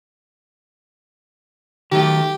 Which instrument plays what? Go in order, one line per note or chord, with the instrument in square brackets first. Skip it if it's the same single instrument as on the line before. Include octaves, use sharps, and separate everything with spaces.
[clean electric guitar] D#3 F#3 A3 [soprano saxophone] G4